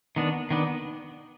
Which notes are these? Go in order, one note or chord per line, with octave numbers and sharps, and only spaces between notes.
D#3 B3 D4
D#3 B3 D4